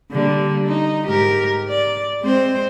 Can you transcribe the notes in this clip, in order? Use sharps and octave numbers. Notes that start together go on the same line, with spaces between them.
D3 G3 A#3
D#4
G#2 G4 A#4
D5
G#3 C4 C5